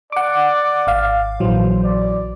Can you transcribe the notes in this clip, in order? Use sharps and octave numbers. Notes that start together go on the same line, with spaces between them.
D5 F#5 D6
G#1 F5
A#1 E3 F#3 C5
D5